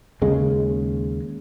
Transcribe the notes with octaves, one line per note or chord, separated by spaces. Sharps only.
D#2 C#3 G#3